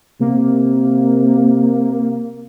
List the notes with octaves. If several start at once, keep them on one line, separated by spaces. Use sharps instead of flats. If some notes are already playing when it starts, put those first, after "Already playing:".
C3 A#3